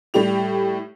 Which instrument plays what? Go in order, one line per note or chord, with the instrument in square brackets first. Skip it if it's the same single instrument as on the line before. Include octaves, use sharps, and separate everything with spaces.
[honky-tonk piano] A2 G3 G4 F7